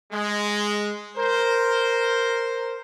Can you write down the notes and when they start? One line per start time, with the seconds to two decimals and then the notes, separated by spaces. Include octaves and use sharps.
0.12 G#3
1.17 A#4 C5